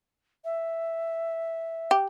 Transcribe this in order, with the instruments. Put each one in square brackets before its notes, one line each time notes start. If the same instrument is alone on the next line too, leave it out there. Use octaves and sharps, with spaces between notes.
[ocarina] E5
[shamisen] G4